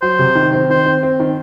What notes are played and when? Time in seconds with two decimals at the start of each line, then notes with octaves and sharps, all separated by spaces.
0.02 F#3 C5
0.19 C3
0.35 D#3
0.53 C4
0.69 D#3 C5
0.86 C4
1.03 C4
1.20 D#3